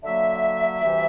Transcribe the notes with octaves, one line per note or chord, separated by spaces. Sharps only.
D3 F#3 A#3 E5
D2 C3 E3 G3